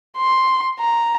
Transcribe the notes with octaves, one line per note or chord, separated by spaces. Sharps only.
C6
A#5